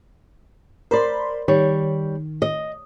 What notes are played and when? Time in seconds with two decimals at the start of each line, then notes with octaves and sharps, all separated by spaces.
0.91 A#4 C5 D5 B5 C6
1.48 D#3 G3 C#5
2.42 D#5